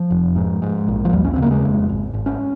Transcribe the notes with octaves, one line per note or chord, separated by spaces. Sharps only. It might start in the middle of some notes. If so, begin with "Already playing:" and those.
Already playing: F3
F1
G#2
G#2
A#1
F3
D#2 G3
C#4
C4
C#3 A#3
G#3
F1
G#1
G#1
C#4